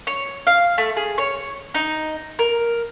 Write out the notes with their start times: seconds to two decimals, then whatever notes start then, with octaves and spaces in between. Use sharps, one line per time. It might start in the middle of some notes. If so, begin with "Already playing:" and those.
0.07 C#5
0.47 F5
0.78 A3
0.97 G#4
1.18 C#5
1.74 D#4
2.39 A#4